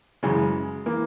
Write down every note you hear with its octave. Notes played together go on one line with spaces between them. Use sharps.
F#2 C#3 E3 G#3
E3 A#3